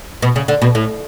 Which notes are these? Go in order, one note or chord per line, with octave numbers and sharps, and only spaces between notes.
B2
C#3
D3
B2
A2